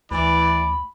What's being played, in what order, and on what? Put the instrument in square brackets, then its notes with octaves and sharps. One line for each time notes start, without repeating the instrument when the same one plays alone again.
[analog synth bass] D2 [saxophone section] E3 [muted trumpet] D5 [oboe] B5